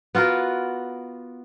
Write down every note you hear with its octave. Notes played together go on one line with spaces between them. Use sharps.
B3 F4 F#4 A#4